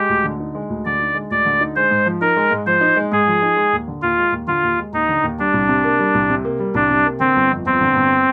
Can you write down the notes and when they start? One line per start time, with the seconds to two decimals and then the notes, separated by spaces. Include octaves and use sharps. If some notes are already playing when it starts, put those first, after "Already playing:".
Already playing: G#3 G4
0.09 D2
0.24 D3
0.40 D#4
0.55 G#3
0.69 D2
0.85 D3 D5
0.99 D#4
1.15 G#3
1.31 D2 D5
1.45 D3
1.61 D#4
1.76 G#3 C5
1.91 G#2
2.06 F3
2.21 D#4 A#4
2.37 G#3
2.51 G#2
2.66 F3 C5
2.81 D#4
2.97 G#3
3.12 G#2 G#4
3.28 F3
3.42 D#4
3.57 G#3
3.73 D#2
3.88 D3
4.02 D#2 F4
4.18 G#3
4.32 D#2
4.47 D3 F4
4.64 D#2
4.79 G#3
4.93 D#2 D#4
5.09 D3
5.23 D#2
5.39 G3 D4
5.54 C2
5.69 C3
5.84 A#3
5.99 G3
6.14 C2
6.30 C3
6.45 A#3
6.59 G3
6.75 C2 D4
6.90 C3
7.06 A#3
7.20 D3 C4
7.36 G1
7.51 F2
7.65 G1 C4
7.80 D3
7.95 G1